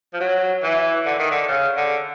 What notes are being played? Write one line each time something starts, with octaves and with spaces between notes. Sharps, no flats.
F3
F#3
E3
D3
D#3
D3
C#3
D3